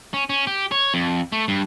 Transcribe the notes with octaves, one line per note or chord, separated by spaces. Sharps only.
C#4
C#4
G4
C#5
F2
A3
G2